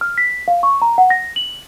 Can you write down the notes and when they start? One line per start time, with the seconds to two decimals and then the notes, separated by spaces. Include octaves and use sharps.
0.01 F6
0.18 B6
0.48 F5
0.63 C#6
0.82 A#5
0.98 F#5
1.10 A#6
1.36 F#7